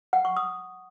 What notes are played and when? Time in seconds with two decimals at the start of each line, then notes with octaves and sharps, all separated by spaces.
0.13 F#5
0.25 C#6
0.37 D#6